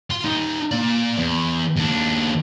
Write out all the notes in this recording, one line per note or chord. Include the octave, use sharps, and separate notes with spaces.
F4 C6
G3 D#4
A#3 D5
E2
D#2 D4